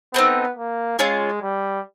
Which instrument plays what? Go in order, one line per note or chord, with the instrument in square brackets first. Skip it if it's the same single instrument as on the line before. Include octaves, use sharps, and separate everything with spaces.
[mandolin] A3 C4 D#4 [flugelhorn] B3
[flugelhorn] A#3
[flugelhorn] G#3 [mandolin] C#4 F4 G#4
[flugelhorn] G3